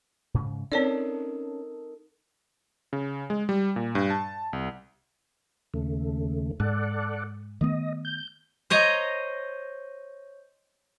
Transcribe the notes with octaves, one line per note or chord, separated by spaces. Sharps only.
G#2 C#3
C4 C#4 D#4 A4 A#4 C#5 D5
C#3
G#3
G3
A#2
G2
A5
C2
D#2 C#3 A3
G#2 A4 D5 F#5
D#3 A3 B3 D#5
G6
C5 C#5 D#5 A#5